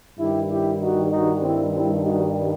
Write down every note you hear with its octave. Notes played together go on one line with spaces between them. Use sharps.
G2 D#3 G3 E4 G4
E4 G4
D#4 F#4
D#4 F#4
C4 E4
C4 E4
D#4 F#4